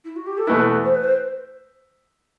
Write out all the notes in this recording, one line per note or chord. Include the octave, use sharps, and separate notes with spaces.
E4
F#4
G4
A4
E2 B2 A3 E4 B4
C5
B4
C5